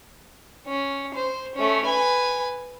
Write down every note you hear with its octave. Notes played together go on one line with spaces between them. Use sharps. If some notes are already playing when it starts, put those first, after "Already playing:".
C#4
C5
A3 C#4
B4 G#5